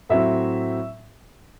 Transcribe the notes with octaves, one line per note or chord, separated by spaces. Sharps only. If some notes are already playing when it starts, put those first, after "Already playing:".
A2 F#3 C4 E5